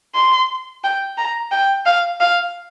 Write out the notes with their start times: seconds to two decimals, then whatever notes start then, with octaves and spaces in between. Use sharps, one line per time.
0.15 C6
0.83 G5
1.18 A#5
1.52 G5
1.86 F5
2.20 F5